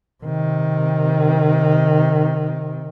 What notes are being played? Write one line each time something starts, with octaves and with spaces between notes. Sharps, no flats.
C3 D#3